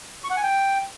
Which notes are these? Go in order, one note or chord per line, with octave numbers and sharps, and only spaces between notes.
C#6
F#5
G#5
G5